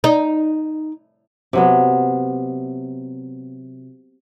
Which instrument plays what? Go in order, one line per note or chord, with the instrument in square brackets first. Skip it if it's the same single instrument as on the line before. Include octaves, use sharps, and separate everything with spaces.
[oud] D#4
[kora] C3 F#3 B3